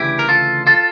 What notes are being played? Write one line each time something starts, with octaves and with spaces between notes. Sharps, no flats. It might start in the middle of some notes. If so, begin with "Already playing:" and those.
Already playing: D2 C#3 E3 E4 G4
A#4
F4 A4
F4 A4